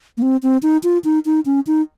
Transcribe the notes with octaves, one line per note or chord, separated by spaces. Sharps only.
A#3
C4
C4
D#4
F4
D#4
D#4
C#4
D#4